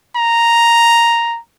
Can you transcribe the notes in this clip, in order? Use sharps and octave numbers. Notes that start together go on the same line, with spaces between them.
A#5